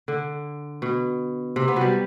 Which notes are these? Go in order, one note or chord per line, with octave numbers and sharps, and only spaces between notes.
D3
B2
C3
B3
F#3 G3